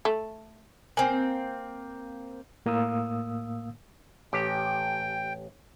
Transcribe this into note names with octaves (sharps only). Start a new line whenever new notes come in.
A3
A#3 C4 G#5
A2 A#3 F5 D#6 E6
A1 G4 G5